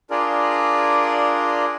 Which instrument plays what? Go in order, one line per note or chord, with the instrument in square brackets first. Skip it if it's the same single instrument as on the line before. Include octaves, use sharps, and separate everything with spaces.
[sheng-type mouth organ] D4 F4 G#4 A#4 D5